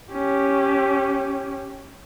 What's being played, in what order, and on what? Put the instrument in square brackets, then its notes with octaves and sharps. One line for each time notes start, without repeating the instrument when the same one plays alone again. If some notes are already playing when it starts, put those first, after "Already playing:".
[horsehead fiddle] C#4 G4